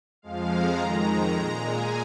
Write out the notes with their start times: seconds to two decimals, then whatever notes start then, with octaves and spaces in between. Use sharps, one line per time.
0.22 F2 F3 G#3 F5
0.51 A#5
0.80 F2 D#3 G#3
1.37 A#2 G#3
1.66 G#5